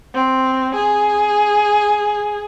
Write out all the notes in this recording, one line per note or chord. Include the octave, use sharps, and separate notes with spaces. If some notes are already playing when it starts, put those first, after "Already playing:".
C4
G#4